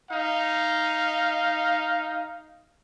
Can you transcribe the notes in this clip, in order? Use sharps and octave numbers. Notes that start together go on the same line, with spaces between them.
D#4 F5